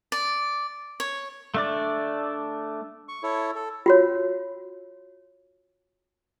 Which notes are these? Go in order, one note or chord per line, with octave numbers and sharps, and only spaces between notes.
D5
C#5
A3 D4 D5
C#6
E4 A4 C#5
A4
F4 F#4 C#5